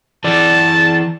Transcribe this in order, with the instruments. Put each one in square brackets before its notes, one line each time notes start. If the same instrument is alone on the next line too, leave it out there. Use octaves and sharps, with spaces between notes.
[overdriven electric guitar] E3 D5 [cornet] A5